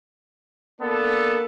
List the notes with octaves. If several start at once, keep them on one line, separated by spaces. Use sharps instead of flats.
A#3 B3 D4 A4